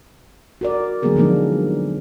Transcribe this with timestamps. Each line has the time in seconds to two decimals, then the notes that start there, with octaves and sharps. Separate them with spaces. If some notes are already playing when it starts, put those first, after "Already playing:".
0.61 F#4 A#4 D5
1.02 D3 F#3 A#3 B3 G#4 A#4
1.16 D3 F3 G#3 A#3 D4 D#4